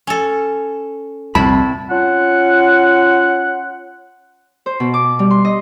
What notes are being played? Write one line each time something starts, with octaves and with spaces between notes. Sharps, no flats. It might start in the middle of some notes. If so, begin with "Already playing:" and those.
C#4 A4
C2 F2 A#2 C4 E4 A5 B5
C#4 F4 F#5
C5
B2
D6
G3
C6
D#5